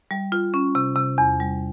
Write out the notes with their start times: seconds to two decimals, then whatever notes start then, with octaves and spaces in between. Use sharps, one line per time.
0.11 G3
0.32 F4
0.54 C#4
0.75 C3
0.96 C3
1.18 E2
1.40 G3